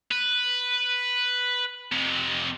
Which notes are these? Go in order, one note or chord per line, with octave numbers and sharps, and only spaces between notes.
B4
F2 C3